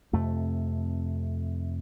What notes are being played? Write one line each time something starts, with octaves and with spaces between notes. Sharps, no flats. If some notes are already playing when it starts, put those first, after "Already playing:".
F2 C3 A3